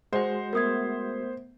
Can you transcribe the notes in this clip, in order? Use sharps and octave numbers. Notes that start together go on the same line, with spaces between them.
G#3 F#4 C5 D#5 F#5
A3 B3 A#4 E5 D#6 G#6